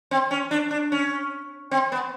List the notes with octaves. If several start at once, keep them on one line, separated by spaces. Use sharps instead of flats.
C4
C#4
D4
D4
C#4
C4
B3